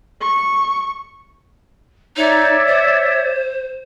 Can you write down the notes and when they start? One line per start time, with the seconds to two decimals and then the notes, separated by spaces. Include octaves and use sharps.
0.21 C#6
2.16 D#4 C#5 D5 E5
2.68 C5